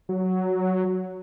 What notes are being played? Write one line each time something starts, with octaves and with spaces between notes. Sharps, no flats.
F#3